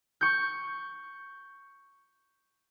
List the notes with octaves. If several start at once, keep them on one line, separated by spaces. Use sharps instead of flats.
C#6 G6